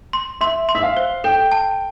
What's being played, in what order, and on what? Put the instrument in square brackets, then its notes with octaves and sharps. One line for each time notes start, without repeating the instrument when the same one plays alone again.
[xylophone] C6
[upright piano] E5 [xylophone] C6
[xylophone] C6
[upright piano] E5
F5
[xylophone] C5
[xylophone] A4 [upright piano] G5
[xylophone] A5